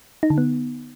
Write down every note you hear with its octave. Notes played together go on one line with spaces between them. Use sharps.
D#4
D3
B3